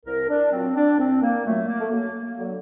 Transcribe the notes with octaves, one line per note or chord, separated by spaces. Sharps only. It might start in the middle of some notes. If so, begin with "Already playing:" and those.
C2 A#4
D4
A#2 F#3 C4
D4
C2 C4
A#3
A#2 F#3 A3
A#3
A3
F#2 A#3
A#3
D3 F#3